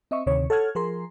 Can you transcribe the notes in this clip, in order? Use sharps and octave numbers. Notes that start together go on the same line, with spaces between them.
C4 D#5 E5 C#6
D2 C3 D#3 C#5
A4 C#5 F#5 F6 G#6
F3 G#4 A#4 C6